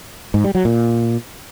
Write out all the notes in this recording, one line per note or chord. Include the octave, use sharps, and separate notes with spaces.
G#2
G3
F#3
A#2